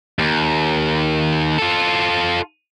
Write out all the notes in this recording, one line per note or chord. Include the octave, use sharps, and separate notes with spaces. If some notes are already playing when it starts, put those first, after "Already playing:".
D#2
F4 A4